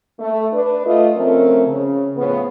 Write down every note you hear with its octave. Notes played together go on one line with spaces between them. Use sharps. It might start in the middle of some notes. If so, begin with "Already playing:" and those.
A3
D4 B4
A3 F4 D#5
F3 A3 C4 C#4 A#4
C#3
A2 C#3 F3 B3